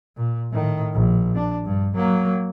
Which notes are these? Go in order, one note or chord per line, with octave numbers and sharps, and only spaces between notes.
A#2
A2 D#3
A#1
D4
G2
F#3 A#3